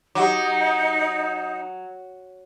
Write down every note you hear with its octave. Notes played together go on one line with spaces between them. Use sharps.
F#3 D#4 G4 F#5 D6